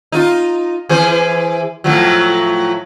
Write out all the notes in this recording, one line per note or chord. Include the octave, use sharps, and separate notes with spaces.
D#4 F4
E3 G#4 C5
A2 F3 F#3